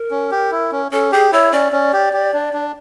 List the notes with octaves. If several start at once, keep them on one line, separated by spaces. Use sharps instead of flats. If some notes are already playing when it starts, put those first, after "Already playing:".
Already playing: A#4
C#4
G4
E4
C#4
C#4 A4
G4 G#4
E4 C#5
C#4 D5
C#4
G4
G4
D4
D4